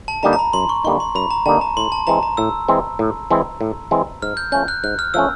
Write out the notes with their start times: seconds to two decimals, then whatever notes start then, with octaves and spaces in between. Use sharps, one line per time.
0.08 A5
0.23 D3 G3 A#3 D#4 A#5
0.33 A#5
0.39 B5
0.53 F#2 C6
0.69 C#6
0.84 D3 G3 A#3 D#4 C#6
1.00 C6
1.15 F#2 B5
1.30 A#5
1.46 D3 G3 A#3 D#4 A5
1.61 A#5
1.77 A2 C6
1.92 A5
2.07 E3 G#3 C4 A#5
2.23 A#5
2.37 A2 E6
2.68 E3 G#3 C4
2.99 A2
3.31 E3 G#3 C4
3.61 A2
3.91 E3 G#3 C4
4.22 G#2 F6
4.37 G6
4.52 F3 A3 C#4 G6
4.68 F#6
4.84 G#2 F#6
4.99 F6
5.14 F3 A3 C#4 E6